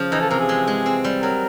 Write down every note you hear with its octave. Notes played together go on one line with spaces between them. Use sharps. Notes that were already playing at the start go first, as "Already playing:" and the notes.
Already playing: C#3 F3
E3 D#4
A4
C3 A#4
G#4
G#3
G#3
C4
G3
F#3 A#4